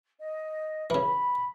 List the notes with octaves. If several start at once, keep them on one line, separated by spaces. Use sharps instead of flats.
D#5
C#3 E3 B5